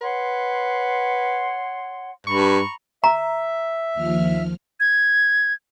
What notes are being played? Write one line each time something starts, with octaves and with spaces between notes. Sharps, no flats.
B4 C#5 F#5 C6
G2 A#5 B5 C#6
E5 A#5
D#2 F3 F6
G#6